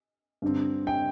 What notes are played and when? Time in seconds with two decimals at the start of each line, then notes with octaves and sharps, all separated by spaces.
0.42 G2 D3 C4
0.87 G5